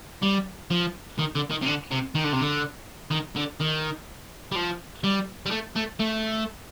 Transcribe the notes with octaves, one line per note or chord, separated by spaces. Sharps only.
G3
F3
D#3
D3
D#3
C3
D3
C3
D#3
D3
C3
D3
D#3
D3
D#3
G3
F3
G3
G3
A3
A3
A3